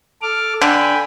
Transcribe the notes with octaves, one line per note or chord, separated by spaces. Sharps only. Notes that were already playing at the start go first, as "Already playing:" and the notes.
A4 D6 F6
D3 G5 G#5 B5